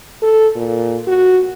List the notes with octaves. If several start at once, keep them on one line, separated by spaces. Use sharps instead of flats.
A4
A#2
F#4